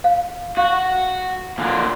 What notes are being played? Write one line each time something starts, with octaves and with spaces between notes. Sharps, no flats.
F5
F#4 F5
A#2 D3 F#3